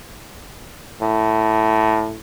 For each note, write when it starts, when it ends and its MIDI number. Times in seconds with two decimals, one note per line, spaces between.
1.01 2.18 45